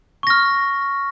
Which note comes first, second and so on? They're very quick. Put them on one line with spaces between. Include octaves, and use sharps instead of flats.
C#6 A#6 F6